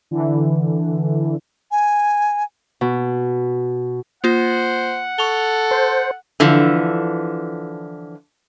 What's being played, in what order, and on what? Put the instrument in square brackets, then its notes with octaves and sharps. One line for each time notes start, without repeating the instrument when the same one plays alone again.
[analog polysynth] D3 E3
[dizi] G#5
[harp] B2
[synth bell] A#3 F4 [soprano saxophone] C5 [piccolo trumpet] F#5
[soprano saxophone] A4 [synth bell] C#6 F7 G7
[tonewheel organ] C5
[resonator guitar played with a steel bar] D3 E3 F3